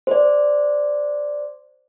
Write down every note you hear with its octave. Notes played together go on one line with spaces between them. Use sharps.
C5 D5